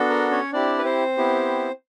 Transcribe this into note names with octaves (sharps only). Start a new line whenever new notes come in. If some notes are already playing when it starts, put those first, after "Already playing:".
Already playing: B3 D4 F#4 A4
A#4
C#4 C#5
C4 D4 E4 G4 D5
B4
C4 C5
B3 E4 G4